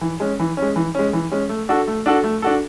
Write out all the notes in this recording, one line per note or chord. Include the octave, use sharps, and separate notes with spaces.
E3
G#3 C#4
E3
G#3 C#4
E3
G#3 C#4
E3
G#3 C#4
A3
D4 F#4 A4
A3
D4 F#4 A4
A3
D4 F#4 A4